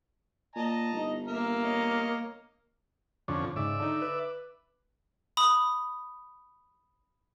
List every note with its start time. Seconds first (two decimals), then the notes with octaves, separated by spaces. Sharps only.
0.56 A#2 D#5 A5 A#5
0.93 G1 D#4
1.27 A#3 A#4 E5
1.64 C#5 D#5
3.28 F2 D3 C#4
3.56 G#2 C#3 D5 E5
3.80 D3 D#4
4.02 B4
5.37 B5 D#6